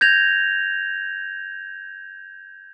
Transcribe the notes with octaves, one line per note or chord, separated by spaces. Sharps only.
G6 G#6 A#6 F7